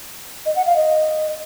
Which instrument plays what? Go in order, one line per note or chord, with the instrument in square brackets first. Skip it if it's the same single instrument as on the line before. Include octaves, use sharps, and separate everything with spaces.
[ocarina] D#5
F#5
F5
D#5